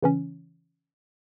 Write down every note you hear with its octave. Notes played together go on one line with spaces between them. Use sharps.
C#3 E3 C#4